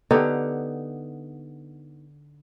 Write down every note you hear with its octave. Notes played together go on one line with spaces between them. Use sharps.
D3 B3 D#4 G4